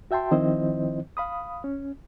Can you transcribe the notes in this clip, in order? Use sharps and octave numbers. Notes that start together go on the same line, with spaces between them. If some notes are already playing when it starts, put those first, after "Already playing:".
F#4 E5 G5 A5 C6
D#3 F3 C4 E4 C5 D#5
F5 B5 D#6
C#4